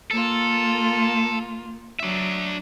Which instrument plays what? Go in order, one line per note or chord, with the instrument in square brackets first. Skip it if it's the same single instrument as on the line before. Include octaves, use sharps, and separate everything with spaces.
[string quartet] A#3 F4 [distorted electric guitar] A4
[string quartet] F#3 [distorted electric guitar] D4 E5